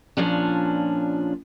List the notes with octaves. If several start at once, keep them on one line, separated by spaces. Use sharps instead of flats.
A#2 F3 C#4 D4